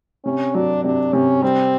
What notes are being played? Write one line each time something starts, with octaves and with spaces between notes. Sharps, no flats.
C3 C#4
F#3 D4
C3 D4
C3 C#4
G3 C4